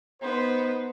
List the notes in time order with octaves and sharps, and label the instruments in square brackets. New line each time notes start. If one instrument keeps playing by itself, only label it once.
[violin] B3 [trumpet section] D#4 C5